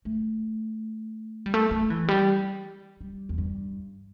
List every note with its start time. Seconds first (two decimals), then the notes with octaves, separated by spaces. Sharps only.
0.05 A3
1.46 G3
1.54 A3
1.71 A3
1.90 E3
2.08 G3
3.01 G3
3.29 E2
3.38 G2